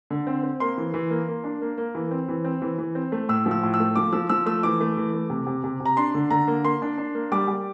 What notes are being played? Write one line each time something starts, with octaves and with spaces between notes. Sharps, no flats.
D3
C4
C4
A#3 C6
E3
E3
A#3
A#3
D4
A#3
A#3
E3
C4
E3
C4
E3
E3
C4
A3
A2 E6
F3
E6
A2
E6
A3
F3 D6
F3 E6
F3 E6
A3 E6
E3 D6
A3
E3
A3
C3
C3
C3
C3
A#5
D4 C6
D3
D3 A#5
A#3
A#3 C6
D4
D4
A#3
G3 D6
G3